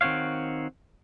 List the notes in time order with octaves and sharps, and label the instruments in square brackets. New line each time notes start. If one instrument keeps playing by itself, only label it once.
[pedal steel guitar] D#3 C4 F#4 C#5 F5